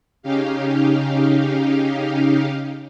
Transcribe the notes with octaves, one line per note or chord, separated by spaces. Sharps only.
C#3 C#4 D#4 G4 F5